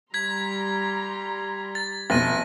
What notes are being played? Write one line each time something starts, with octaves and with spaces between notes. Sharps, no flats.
G3 A#5 C6 G#6 B6
A6
F1 B2 A6 A#6 D#7